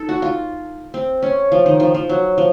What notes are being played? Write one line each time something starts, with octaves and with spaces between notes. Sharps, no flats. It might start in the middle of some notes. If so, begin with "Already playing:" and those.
Already playing: D#4 A4
F#4
F4
C4
C#4
F3
D#3
F3
F3
F#3
F3